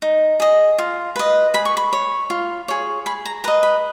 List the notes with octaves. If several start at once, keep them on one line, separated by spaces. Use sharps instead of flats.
D#4
G#4 D#5
F4
B4 D#5
G#4 B5
C#6
B5
C#5
F4
G#4 C#5
G#4 B5
A#5
B4 D#5 A#5
B5